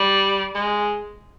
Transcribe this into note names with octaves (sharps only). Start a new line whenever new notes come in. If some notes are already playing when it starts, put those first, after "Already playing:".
Already playing: G3
G#3